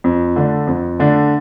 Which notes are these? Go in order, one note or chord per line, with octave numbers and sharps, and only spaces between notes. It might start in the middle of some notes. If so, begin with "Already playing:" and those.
F2
D3 A3 D4
F2
D3 A3 D4